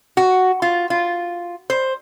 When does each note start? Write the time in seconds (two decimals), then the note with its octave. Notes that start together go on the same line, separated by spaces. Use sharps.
0.17 F#4
0.62 F4
0.90 F4
1.70 C5